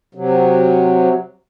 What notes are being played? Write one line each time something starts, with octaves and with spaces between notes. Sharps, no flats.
C3 F#3